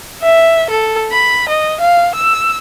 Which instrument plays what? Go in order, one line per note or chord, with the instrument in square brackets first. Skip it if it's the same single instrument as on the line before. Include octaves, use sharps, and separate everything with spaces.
[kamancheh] E5
A4
B5
D#5
F5
E6